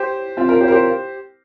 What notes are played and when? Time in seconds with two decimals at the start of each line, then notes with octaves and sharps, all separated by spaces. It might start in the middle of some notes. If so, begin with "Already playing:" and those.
Already playing: G4 C5
0.37 C4 F4
0.49 F4 A#4
0.61 G4 C5
0.68 A#4
0.72 G4 C5